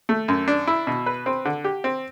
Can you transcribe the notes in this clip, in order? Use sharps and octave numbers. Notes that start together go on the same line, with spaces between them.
A3
F#2
D4
E4
B2
B4
C4
D3
G4
C4